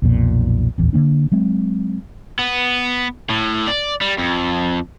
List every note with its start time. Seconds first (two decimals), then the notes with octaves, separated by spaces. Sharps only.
0.02 B1 F2 A#2
0.78 D1 A#1 E2 E3
0.93 D3 F3 A#3 D4
1.32 F#3 G#3 C4
2.39 B3
3.29 A2
3.68 D5
4.01 G3
4.19 F2